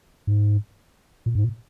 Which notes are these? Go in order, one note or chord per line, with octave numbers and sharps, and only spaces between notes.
G#2
A#2
G#2
A#2